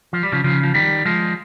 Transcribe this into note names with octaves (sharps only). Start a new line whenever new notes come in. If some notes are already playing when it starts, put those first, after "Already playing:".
F3
G3
C#3 F3
C#3 F3
F3
D#3 G3
F3 G#3